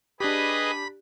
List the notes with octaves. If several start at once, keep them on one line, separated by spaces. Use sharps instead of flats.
D4 G4 G#4 B4 D#5 B5